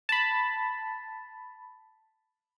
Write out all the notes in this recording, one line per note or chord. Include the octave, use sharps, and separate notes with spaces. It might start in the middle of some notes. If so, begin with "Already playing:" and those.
A5 B5